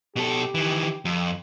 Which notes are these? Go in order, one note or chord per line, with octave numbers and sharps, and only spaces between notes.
B2 G4 A4
D#3 E3
F2